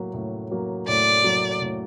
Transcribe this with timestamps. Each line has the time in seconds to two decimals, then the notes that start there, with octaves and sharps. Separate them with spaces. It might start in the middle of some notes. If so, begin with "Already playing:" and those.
Already playing: A2 F#3 A#3
0.14 A2
0.51 F#3 A#3
0.88 A2 D5
1.24 F#3 A#3
1.62 A2